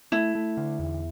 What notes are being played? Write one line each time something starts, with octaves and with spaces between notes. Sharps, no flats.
A3 E4
A3
D3
E2